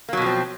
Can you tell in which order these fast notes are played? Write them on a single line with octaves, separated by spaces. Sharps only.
A#3 F#3 B2 F3 C4